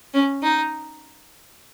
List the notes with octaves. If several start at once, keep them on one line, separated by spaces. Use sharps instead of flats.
C#4
D#4